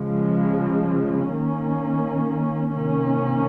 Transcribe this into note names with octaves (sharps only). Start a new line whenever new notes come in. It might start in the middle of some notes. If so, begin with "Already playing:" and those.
Already playing: C#3 F3 G#3
D#3 A#3 C#4
C3 D#3 A#3 C#4